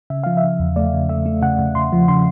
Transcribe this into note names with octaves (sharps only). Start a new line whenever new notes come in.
C#3 E5
F3 F5
E5
C#3
E2
A3 D5
C#3
A3 E5
A3
C#3 F#5
C#3
C#3 C6
F3
C#3 C6